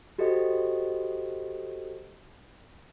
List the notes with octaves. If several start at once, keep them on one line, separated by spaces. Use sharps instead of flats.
F#4 G4 A4 C5 D#5